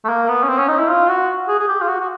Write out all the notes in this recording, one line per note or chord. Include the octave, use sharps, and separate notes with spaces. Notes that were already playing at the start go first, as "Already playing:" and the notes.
A3
A#3
B3
C#4
C4
C#4
D#4
E4
F4
F#4
G#4
G#4
G4
F4
F#4
F#4